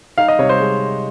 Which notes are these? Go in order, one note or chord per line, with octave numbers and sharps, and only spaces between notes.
D#4 F5
D#5
C3 C#5
C5
G#3